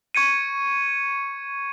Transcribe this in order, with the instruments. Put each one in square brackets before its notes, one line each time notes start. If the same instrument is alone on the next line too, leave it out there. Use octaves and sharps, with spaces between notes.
[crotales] C#6 G#6 C#7 D#7